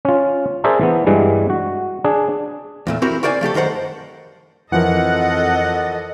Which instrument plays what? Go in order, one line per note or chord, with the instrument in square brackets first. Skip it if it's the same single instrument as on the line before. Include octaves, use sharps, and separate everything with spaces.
[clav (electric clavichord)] C#4 F4
G#4 A#4 C5 D5 E5 A5
E3 B3
G2 E3 G3 G#3
F#4
D4 G#4
[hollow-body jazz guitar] E2 A#2 A3
C4 E4 F#4 G4 A#4
F#4 A#4 C5 D5 G5 G#5
F3 A3 G4 A4
F#2 D#3 A#4 C5 F#5
[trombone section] F2 [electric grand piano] E3 F3 A#4 [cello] A4 D#5 [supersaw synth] F#5